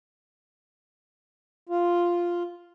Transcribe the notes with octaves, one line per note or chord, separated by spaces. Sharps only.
F4